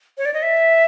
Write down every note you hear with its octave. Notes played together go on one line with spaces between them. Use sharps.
C#5
D5
D#5
E5